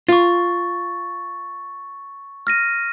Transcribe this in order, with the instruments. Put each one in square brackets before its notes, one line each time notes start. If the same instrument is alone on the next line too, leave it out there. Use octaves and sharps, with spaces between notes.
[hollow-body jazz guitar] F4 [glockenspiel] C#6 A6
[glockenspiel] F6 A#6 D#7